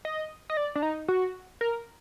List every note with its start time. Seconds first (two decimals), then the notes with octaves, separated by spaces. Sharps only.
0.05 D#5
0.50 D#5
0.57 D5
0.76 D4
0.83 D#4
1.08 F#4
1.61 A#4